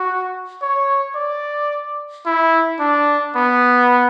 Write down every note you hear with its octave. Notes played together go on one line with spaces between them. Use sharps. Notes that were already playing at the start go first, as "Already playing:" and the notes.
Already playing: F#4
C#5
D5
E4
D4
B3